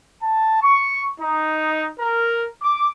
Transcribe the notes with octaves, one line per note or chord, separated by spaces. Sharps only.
A5
C#6
D#4
A#4
D6